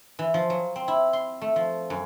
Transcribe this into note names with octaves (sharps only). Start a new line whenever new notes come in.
E3
F3
F#3
C4
E4
C6
A3
F3
F#2